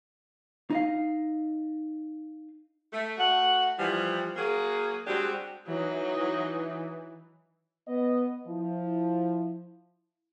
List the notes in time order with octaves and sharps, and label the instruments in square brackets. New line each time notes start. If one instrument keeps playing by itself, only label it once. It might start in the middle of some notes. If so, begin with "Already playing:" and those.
[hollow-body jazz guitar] D#4 D#5 F5
[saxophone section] A3
A3 F#4 F#5
E3 F3 G3
F#3 A#3 G#4
G3 G#3 C4 D4 F#4 G4
[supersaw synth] E3 [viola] F#3 D#4
[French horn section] B3 D#5
F3 E4